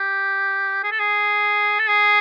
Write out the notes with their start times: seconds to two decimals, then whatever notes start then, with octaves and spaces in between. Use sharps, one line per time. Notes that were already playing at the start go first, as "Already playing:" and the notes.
Already playing: G4
0.83 G#4
0.91 A4
0.99 G#4
1.79 A4
1.88 G#4